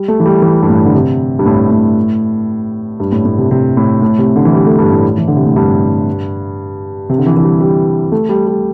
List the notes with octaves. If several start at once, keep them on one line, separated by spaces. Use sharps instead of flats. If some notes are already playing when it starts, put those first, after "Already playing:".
Already playing: G3
A3
E3
G3
E3
G2
A2
D3
C3
G2
A2
A2
G2
A2
A2
C3
C3
A2
A2
C3
D3
E3
G3
A3
G2
A2
E3
D3
C3
A2
G2
C3
D3
E3
E3
G3
G3
A3
G3
G3